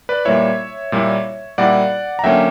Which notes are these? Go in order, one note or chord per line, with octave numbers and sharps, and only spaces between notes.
B4 D5
A#2 G3 A#3 E4 C#5 E5
A#2 G3 A#3 E4
A#2 G3 A#3 E4 D5 F#5
A#5
D3 F#3 A#3 C#4 E5 G5